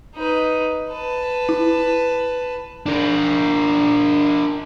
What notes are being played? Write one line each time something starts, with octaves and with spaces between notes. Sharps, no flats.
D#4 B4
B4 A5
E4
D4 A#4